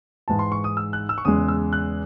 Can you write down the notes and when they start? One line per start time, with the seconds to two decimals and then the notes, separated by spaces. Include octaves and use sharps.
0.28 G#2 E3 G#3 A5
0.39 C6
0.52 C#6
0.64 D#6
0.77 E6
0.93 F#6
1.09 E6
1.18 C#6
1.25 E2 C#3 G#3 D#6
1.48 E6
1.73 F#6